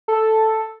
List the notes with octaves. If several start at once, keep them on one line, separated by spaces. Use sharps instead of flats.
A4